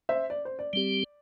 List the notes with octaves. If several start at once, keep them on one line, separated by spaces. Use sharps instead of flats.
C5 E5
D5
C5
D5
G3 C4 G4